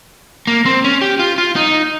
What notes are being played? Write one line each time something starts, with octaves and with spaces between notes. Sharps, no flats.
A#3
C4
C#4
G4
F4
F4
D#4